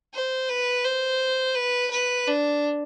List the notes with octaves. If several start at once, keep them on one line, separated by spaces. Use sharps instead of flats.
C5
B4
C5
B4
B4
D4